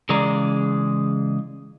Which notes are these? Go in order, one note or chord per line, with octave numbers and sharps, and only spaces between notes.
C#3 E3 G#3 D5 A#5